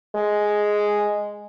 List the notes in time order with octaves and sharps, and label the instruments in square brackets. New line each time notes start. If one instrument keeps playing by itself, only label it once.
[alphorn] G#3